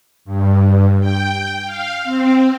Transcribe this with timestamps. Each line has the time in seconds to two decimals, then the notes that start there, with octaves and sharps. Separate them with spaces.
0.25 G2
1.00 G5
1.65 F5
2.04 C4